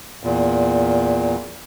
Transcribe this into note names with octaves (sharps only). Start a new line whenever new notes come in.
E2 A#2